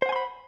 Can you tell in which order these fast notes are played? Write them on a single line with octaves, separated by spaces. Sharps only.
C5 F#5 G#5 C6 B5